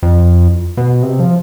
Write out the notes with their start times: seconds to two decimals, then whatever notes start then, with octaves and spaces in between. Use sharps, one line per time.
0.03 F2
0.77 B2
1.03 C3
1.19 F3